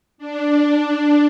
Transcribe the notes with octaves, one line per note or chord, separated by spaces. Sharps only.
D4